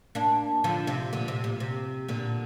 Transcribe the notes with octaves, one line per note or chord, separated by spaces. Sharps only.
A#3 D4
D3 F3
C3
A#2 D3
C3
A#2
C3
A#2 D3